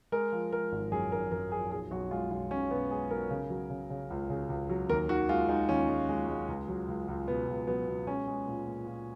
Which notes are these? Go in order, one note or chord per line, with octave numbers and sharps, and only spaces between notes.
G#3 A#4
F3
G#3 A#4
G#1
F#2 G#4
G#1 A#4
F#2 A#4
F3 G#4
B1 G#4
B1 F#4
G#3 F4
B1 F4
B1 C#4
B2 B3
G#3 G#4
B1 A#4
C#3
F#3
C#3
C#3
C#2
C#3
C#2
F#3
D#2 A#4
D#3 F#4
G#3 F4
G#3 D#4
D#2 C#4
G#3
G#3
G#3
C#2
F#3
C#2
C#2
B2 B3
C#2
F#3 B3
B2
G#3 C#4
G#3
A#2
A#2
A#2